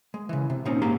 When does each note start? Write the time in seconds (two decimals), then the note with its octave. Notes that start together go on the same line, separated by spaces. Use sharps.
0.14 G#3
0.29 C#3 E3
0.50 C3
0.65 A#2 C4 C#4 D#4
0.82 G#2 G#3 A#3 G4 F5 A#5